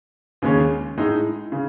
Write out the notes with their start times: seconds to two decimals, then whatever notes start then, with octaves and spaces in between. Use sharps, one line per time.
0.42 D#2 C#3 G#3 C#4
0.97 A2 G#3 D#4
1.52 C#3